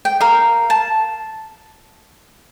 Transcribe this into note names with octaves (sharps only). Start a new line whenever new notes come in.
G5
A#4 F5
A5